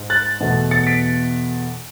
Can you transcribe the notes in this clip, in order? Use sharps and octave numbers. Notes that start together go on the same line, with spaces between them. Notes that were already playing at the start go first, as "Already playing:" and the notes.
Already playing: G#2
F#6 A6
E2 B2 A3
A6 C#7
B6 D7